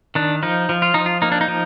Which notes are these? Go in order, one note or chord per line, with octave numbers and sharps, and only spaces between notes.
D#3 D4
F3 D#4
F3
F4
F3 D#4
F4
A#3 D#4
D4
D#4
F3